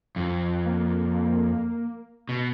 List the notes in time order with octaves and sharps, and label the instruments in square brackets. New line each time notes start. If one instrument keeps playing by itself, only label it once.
[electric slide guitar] F2
[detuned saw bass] A#3
[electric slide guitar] B2